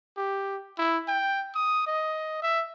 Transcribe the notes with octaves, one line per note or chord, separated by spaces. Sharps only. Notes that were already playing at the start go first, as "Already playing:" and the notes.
G4
E4
G5
D#6
D#5
E5